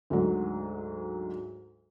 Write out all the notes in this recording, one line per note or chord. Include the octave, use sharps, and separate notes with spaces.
D2 G#2 F#3